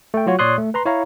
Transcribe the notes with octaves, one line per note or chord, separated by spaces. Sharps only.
A3 G5
F#3 F4 F#4 C#5
A#2 C#5 D5 C6 D#6 F#6
A3
B4 A#5 C6
E4 C#5 F5 A#5